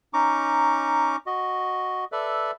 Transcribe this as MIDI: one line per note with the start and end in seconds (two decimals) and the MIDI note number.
0.13 1.16 61
0.13 1.16 63
0.13 1.16 82
0.13 1.16 85
0.13 1.16 86
1.26 2.05 66
1.26 2.05 75
2.12 2.51 69
2.12 2.51 71
2.12 2.51 74
2.12 2.51 76